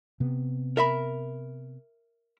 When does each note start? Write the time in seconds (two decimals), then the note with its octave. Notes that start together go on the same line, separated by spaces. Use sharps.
0.20 C3 B3
0.77 A#4 E5 B5